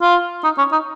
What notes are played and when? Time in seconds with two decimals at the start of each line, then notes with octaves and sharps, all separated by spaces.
0.02 F4
0.44 D#4
0.58 C#4
0.72 D#4